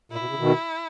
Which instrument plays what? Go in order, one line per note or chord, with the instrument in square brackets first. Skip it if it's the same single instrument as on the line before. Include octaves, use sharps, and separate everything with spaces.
[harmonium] A#2 [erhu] E4
[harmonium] B2
C#3
B2 D#3